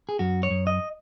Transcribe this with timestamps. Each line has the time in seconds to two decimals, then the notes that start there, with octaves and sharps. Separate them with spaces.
0.09 G#4
0.19 F#2 F#4
0.43 C#5
0.51 F#2
0.67 D#5